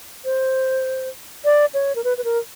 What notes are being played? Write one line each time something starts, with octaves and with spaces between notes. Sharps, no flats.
C5
D5
C#5
A#4
B4
B4
A#4